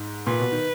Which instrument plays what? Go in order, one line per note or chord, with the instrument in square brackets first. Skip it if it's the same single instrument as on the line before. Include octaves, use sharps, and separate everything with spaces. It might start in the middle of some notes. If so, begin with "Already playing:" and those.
Already playing: [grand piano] G#2
[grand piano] A#2 [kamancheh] B4
[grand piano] B2
D#3